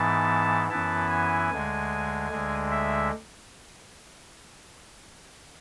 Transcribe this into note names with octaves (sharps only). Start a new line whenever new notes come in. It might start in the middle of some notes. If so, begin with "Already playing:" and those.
Already playing: G#2 E3 B3 A5
F#2 E3 B3 E4 A5
G#5
D2 D3 G#3
D2 D3 G#3
E5